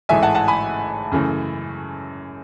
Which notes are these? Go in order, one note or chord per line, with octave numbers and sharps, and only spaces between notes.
A1 G#2 E3 A3 E5 G#5
F#5 A5
F#5 A5
G#5 B5
F#2 C#3 E3 A3